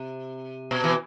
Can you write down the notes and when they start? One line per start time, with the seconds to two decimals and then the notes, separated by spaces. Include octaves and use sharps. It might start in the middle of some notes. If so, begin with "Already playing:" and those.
Already playing: C3
0.71 B2
0.84 E3